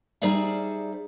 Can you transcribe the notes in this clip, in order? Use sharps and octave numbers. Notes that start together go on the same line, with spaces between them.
G3 D#4 G#4 C5 D5 E5